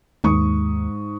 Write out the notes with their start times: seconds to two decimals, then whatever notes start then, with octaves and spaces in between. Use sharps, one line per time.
0.24 D#2 G#2 C#6 D#6